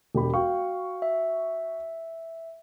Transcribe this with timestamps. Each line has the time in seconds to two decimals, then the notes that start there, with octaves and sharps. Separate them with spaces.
0.15 E1 G4 B5
0.34 F#4 F5 G5 C#6
1.02 E5